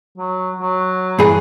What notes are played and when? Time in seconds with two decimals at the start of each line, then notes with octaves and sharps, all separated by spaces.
0.18 F#3
0.60 F#3
1.19 G2 E3 G#4